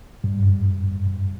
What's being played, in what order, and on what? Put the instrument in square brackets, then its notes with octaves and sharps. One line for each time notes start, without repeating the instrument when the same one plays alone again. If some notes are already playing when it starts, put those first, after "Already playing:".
[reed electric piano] G2
G2
G2
G2
G2